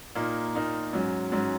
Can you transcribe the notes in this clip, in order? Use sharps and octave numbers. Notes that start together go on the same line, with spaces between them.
A#2 A#3 D#4
A#2 A#3 D#4
G#2 F#3 C#4
G#2 F#3 C#4